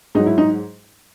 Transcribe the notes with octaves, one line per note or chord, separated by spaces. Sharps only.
G#2 F#3 D#4
E4
D#4